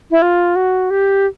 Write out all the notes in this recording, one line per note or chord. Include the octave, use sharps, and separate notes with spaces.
E4
F4
F#4
G4